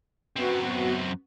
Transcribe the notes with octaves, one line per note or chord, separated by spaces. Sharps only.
F#2 B3 C4 F#4